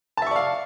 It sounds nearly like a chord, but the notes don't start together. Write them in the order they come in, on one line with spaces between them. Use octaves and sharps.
A5 E5 C#6 D5 F5